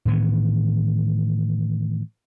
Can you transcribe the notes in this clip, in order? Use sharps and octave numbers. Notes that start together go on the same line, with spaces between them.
A2 D#3 E3 B3